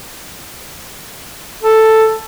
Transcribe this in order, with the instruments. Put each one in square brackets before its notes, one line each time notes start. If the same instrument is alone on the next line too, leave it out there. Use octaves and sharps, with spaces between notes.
[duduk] A4